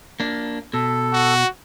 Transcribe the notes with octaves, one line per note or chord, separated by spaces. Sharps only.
A#3 D4
B2 A4
F#4